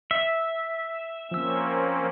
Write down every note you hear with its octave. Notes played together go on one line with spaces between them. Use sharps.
E5
F3 A#3 C4 C#4 E6